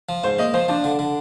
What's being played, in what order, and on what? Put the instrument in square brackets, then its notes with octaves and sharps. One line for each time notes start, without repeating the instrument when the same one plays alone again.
[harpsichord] F3
[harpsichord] G#2 [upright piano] C5
[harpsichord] A#3 [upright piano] D#5
[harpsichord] F3 [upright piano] C5
[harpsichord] F3 [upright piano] D4
[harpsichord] D3
D3